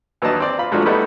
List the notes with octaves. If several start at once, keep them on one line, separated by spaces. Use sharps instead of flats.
D#2 E3 F#3 D4 D#5 A5
C4 D5
F4 B5
G#2 F3 F#3 A3 D4 F#4
G3 A3 B3 D#4 E4